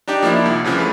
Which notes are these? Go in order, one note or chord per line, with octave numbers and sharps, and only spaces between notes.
D4 D#4 G4 D5
F3 A#3 D4 E4
C2
F2 C#3 E3 F3
A3 B4